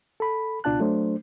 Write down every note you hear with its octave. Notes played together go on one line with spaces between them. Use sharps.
A4 B5
C#2 B2 D4 F4 A5 F#6
F#3 A3 D4 C5